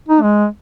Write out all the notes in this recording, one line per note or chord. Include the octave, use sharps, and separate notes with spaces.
D#4
G#3